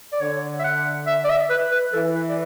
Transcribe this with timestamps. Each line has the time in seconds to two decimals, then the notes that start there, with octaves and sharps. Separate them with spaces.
0.13 D5
0.21 D3 C#5
0.60 E5
0.64 F#5
1.07 E5
1.24 D5
1.29 E5
1.50 B4
1.71 B4
1.93 E3 A4
2.15 B4
2.29 D5